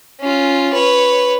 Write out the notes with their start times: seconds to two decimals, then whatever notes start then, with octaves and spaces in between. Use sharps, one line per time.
0.20 C#4 F4
0.74 B4 C#5